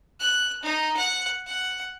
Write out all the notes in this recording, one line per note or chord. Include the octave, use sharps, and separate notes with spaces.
F#6
D#4
F#5
F#5